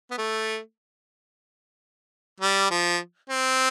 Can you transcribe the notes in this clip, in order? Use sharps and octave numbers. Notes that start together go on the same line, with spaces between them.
B3
A3
G3
F3
C4